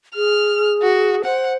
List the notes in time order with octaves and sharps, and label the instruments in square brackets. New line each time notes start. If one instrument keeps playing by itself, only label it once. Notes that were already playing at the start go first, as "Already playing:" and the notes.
[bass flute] G#4 [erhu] F6
[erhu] F#4
[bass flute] C5 [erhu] F#5